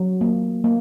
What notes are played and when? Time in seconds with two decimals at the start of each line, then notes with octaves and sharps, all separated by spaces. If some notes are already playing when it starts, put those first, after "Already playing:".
Already playing: F#3
0.21 A#3
0.64 A#3